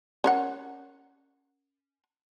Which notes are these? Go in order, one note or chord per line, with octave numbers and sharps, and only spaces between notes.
C#4 A#4 F#5